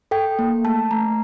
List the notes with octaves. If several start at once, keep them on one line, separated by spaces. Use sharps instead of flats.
A4 G5
A#3
A3 A5
A3 A#5